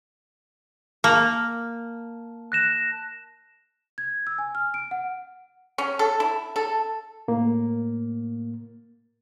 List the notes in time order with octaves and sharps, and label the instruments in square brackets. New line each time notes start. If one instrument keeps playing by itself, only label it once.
[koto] A#3 [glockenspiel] A5
[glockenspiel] F#6 A#6 E7
[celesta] G#6
E6
G#5
F6
D7
F#5
[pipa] C#4
A4
E4
A4
[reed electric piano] A2 A#3